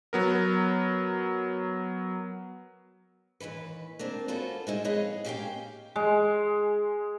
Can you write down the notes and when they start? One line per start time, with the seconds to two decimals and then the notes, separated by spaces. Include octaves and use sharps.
0.13 F#3 B3 A#4
3.40 D#2 D#3 E3 B4
3.99 A#3 C4 D4
4.28 B3 C#4 F4 F#4 A4 C5
4.67 G#3 D#4 E4
4.84 F3 B3 G#4 C#5 D#5 F5
5.25 A#3 C#4 G4 E5 F5 G5
5.96 G#3